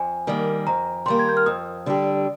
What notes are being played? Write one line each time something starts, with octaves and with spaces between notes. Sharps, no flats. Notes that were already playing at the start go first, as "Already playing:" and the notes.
Already playing: F2 G#5
D#3 G3 A#3
F2 A#5
D#3 G3 A#3 C6
G#6
G6
F6
F2 D#6
D3 G3 D4 G4